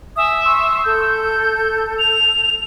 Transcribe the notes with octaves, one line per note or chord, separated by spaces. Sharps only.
E5 G#5 D#6
C6 C#6 E6
A4 G6
F7